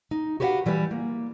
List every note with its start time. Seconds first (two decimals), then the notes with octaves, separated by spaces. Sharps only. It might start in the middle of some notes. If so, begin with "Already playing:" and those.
0.11 D#4
0.40 F#4 G4 B4 C5 F5 F#5
0.66 E3 G3 G4 B4
0.91 A#3